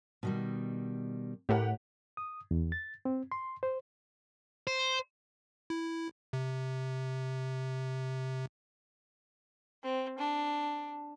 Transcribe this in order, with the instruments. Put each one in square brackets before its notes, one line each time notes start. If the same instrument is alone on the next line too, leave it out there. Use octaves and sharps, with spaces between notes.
[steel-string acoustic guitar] B2 D#3 G3
[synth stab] A2 [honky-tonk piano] G4 A#4 F#5
[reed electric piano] D#6
E2
A6
C4
C6
C5
[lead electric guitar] C5
[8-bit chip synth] E4
C3
[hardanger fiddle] C4
D4